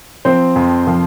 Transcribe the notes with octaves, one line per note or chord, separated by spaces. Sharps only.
F3 C4 C5
F2
F3